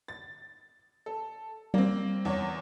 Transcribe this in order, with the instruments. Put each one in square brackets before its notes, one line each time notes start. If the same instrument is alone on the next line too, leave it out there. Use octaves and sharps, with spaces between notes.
[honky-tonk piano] A6
A4
[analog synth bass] G3 [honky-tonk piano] A#3 C4
[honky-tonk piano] E2 C#5